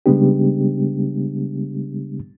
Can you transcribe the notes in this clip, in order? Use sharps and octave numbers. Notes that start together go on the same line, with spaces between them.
C#3 G3 G#3 B3 D4 G4